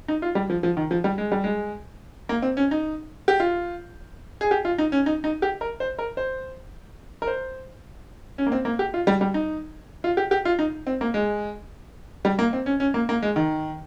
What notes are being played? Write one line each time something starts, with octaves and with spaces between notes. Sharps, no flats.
D#4
F4
G3
F3
F3
D#3
F3
G3
G#3
G3
G#3
A#3
C4
C#4
D#4
G4
F4
G#4
G4
F4
D#4
C#4
D#4
D#4
G4
A#4
C5
A#4
C5
A#4
C5
C#4
A#3
C4
A#3
G4
F4
G3
G3
D#4
F4
G4
G4
F4
D#4
C4
A#3
G#3
G3
A#3
C4
C#4
C#4
A#3
A#3
G#3
D#3